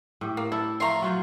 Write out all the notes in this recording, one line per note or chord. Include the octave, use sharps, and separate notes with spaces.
A2 G4
A#3
E4 A4
A2 F3 A3 A#5 C6
F#3 F4 C5